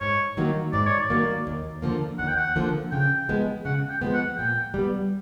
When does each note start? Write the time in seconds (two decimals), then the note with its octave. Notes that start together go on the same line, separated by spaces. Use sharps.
0.01 G#2 C#5
0.37 D#3 F#3 A#3
0.73 G#2 D5
0.87 C#5
0.99 D5
1.10 D#3 F#3 A#3
1.47 D#2
1.82 D3 F3 A#3
2.19 D#2 F#5
2.28 G5
2.37 F#5
2.56 D3 F3 A#3
2.92 C#3 G5
3.29 F3 G#3 B3
3.65 C#3 F#5
3.90 G5
4.02 F3 G#3 B3
4.14 F#5
4.38 A#2 G5
4.74 G3 B3